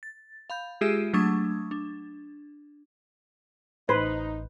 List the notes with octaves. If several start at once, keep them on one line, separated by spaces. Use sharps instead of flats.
A6
F5 B5 G6
G#3 F4 G4 G#4 E5 E6
F#3 A3 D4 C#6 D#6 G#6
D4
A1 D#4 B4 C5